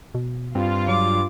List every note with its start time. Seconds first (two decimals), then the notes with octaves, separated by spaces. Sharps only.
0.15 B2
0.55 G2 C4 F4
0.88 F#3 D6